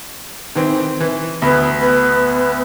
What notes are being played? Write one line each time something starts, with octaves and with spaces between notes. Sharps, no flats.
D#3 E3 C4
E3
D2 B3 B5
B3